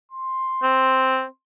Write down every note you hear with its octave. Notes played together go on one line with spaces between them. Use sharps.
C6
C4